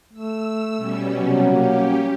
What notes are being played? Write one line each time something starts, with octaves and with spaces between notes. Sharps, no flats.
A3 E6
B2 G3 C#4
C3 F#3
A#3 C#4 G4